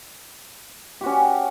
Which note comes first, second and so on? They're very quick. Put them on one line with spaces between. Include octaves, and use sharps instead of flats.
G4 F#4 C#4